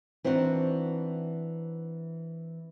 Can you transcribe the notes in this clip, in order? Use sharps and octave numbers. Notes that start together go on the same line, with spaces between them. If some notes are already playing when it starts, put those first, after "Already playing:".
E3 C4 D4 D#4 F#4